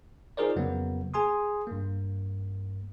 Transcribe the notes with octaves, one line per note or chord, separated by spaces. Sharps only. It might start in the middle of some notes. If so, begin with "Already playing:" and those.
D#4 F4 G#4 A#4 C5 D5
F2 C#3 F#3 A#3 B3
G#4 G#5 C6 D#6
G2 A#3